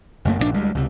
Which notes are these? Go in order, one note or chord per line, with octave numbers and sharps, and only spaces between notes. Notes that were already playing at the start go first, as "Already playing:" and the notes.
F#1 F#2 A3 A#3
A#1 G#2 C3 D4
D2 G3 G#3
C#2 C3